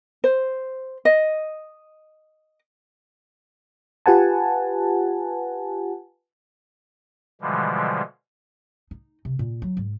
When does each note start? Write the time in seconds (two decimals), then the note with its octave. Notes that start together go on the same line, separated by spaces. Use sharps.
0.24 C5
1.05 D#5
4.06 F4 G4 B4 F#5 G#5 A5
7.41 B2 D3 E3 F3 G3 G#3
8.91 D#4
9.25 C3
9.39 A#2
9.62 F#3
9.77 G#2